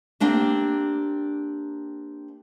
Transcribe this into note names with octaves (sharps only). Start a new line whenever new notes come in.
A#3 C4 D4 G4